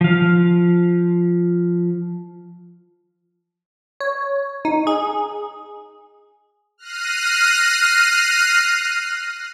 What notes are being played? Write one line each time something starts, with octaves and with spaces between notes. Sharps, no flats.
F3 F5
C#5
D#4
G#4
F6 F#6 A#6 C7 D#7